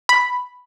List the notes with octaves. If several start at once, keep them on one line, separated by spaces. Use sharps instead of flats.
B5